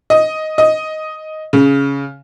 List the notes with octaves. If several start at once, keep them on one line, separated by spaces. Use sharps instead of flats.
D#5
D#5
C#3